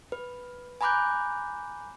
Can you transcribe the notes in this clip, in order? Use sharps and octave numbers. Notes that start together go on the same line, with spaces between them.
B4
G#5 A#5 B5 D6 F#6 G6